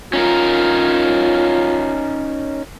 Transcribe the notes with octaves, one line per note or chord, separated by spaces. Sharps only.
C#4 D#4 F4 A#4